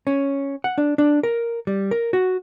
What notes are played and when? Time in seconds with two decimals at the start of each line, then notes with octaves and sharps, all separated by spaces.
0.07 C#4
0.64 F#5
0.78 D4
0.98 D4
1.23 A#4
1.67 G3
1.91 A#4
2.13 F#4